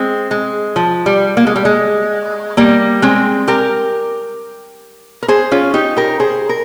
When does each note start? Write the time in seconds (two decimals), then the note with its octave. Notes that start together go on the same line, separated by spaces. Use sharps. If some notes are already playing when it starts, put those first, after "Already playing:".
Already playing: G#3 C4
0.31 G#3
0.76 F3
1.06 G3
1.37 A#3
1.47 G#3
1.56 G3
1.65 G#3
2.57 G3 A#3
3.02 G#3 C4
3.48 G4 A#4
5.23 A#4
5.28 G#4 C5
5.52 C#4 F4
5.74 D#4 G4
5.97 G4 A#4
6.20 G#4 C5
6.49 A#4